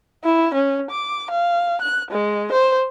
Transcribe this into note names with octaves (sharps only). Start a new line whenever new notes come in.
E4
C#4
D6
F5
F#6
G#3
C5